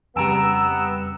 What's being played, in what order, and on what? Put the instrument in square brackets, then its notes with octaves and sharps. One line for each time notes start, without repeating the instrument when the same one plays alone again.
[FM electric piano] F2 C#3 G3 [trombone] B3 [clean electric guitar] G5 A#5 [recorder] E6